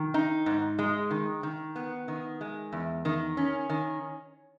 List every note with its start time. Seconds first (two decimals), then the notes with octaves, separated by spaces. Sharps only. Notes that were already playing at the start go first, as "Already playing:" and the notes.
Already playing: D#3
0.14 D#4
0.46 G#2
0.79 G#3
1.11 D#3
1.43 D#3
1.76 B3
2.08 D#3
2.41 G#3
2.73 E2
3.05 D#3
3.37 C#4
3.69 D#3